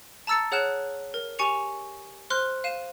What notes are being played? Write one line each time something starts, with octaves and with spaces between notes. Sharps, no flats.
A5 A#5 E6 A6 C#7
G#4 C#5 F#5 F6 F#6 E7
A#4
G4 G#5 C#6 C#7 F7
C5 C6 F6 F#6
F5 D#7 E7